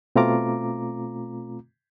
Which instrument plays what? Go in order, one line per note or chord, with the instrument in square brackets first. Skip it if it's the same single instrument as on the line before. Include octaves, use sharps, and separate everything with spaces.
[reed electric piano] B2 A3 C4 F4 A#5 D6